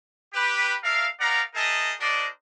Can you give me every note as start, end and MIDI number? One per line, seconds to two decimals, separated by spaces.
0.34 0.74 67
0.34 0.74 71
0.83 1.07 62
0.83 1.07 70
0.83 1.07 76
0.83 1.07 77
1.19 1.42 63
1.19 1.42 70
1.19 1.42 74
1.19 1.42 77
1.19 1.42 78
1.19 1.42 82
1.54 1.92 63
1.54 1.92 68
1.54 1.92 70
1.54 1.92 75
1.54 1.92 76
1.54 1.92 81
2.00 2.26 62
2.00 2.26 66
2.00 2.26 70
2.00 2.26 72
2.00 2.26 74
2.00 2.26 75